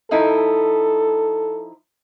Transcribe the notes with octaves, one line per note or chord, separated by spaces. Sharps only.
F3 D#4 E4 A4